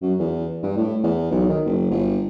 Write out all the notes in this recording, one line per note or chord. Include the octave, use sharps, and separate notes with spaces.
F#2
E2
G2
A2
E2
B1
D#3
F#1
G1